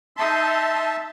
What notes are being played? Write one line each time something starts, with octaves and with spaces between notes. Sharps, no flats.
D#4 E5 A5 C6